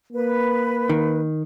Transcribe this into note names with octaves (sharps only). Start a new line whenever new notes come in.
A#3 B4
D#3